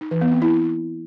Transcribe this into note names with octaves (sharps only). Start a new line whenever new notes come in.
D#4
E3
B3
C4
E4